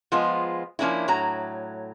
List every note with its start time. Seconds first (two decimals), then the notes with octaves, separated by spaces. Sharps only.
0.12 F3 G#3 B3 F4 C5
0.79 F3 A#3 C#4 D4 E4
1.08 A2 F#3 A#5